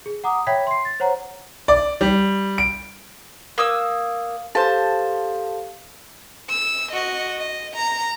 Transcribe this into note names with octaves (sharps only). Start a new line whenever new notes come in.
G#4
F#5 A#5 D6 D#6
C#5 E5 G5 B5 G#6 B6
C6 C7
A6
C5 C#5 F#5 A#5
D5
G3
D7
A#3 D#6 E6
G4 A4 C5 F5 A5
E6
F#4 D#5
D#5
A#5